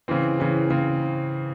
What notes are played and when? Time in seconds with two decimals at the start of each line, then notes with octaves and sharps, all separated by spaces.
0.08 C#3 E3 C4
0.40 C#3 E3
0.70 C#3 C4